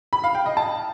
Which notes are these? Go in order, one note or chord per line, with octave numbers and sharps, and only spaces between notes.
B5
F5
G5
D#5
A5